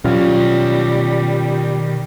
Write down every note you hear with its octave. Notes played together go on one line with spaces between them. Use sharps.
B2 D#3 F#3 G3 C#4 F4 C#5 F6